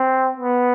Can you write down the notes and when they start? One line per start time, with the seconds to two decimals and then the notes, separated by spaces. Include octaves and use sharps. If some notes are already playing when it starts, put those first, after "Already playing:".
Already playing: C4
0.37 B3